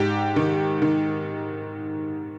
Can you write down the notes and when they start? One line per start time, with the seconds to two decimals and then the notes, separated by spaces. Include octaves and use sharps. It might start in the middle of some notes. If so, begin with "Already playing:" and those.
Already playing: G#2 G4
0.36 D#3
0.82 D#3